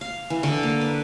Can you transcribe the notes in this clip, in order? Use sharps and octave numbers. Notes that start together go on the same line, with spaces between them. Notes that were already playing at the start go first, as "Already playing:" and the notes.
F5
E3
D3
A#3
B4